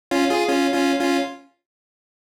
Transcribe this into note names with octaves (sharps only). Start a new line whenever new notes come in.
C#4 F4
F4 G#4
C#4 F4
C#4 F4
C#4 F4